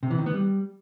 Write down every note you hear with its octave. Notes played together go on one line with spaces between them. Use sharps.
C3
E3
D#3
B3
G3